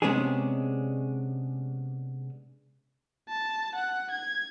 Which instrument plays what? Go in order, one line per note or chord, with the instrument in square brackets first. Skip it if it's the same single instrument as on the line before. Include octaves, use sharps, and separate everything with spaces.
[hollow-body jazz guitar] C3 G#3 B3 C#4 D4 G#4
[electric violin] A5
F#5
G#6